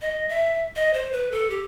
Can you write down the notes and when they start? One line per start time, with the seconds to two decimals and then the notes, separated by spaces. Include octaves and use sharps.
0.01 D#5
0.29 E5
0.76 D#5
0.93 C5
1.12 B4
1.31 A4
1.50 G4